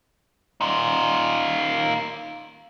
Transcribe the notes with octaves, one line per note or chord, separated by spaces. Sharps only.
D#4 F4